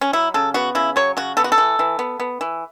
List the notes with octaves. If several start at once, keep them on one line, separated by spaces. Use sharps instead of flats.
C#4
F#3 E4
C#3 A4
B3 F#4
C#3 E4
F#3 C#5
C#3 F#4
B3 A4
F#4
A4
E3
E3
B3
B3
E3